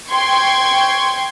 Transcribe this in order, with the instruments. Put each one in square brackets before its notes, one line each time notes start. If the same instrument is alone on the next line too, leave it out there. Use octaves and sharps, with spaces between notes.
[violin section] G5 C6 C#6 G#6